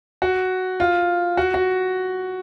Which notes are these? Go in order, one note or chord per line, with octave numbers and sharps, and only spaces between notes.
F#4
F4
F#4
F#4